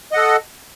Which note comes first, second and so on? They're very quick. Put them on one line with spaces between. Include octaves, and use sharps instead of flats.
D#5 F#5 A4